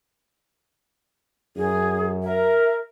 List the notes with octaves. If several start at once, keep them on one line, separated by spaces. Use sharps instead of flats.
F#2 G#4
A#4 E5